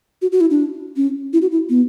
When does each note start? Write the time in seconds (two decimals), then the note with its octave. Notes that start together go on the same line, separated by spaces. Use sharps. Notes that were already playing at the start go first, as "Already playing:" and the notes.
0.22 F#4
0.32 F#4
0.41 E4
0.51 D4
0.96 C#4
1.33 E4
1.42 F#4
1.51 E4
1.70 B3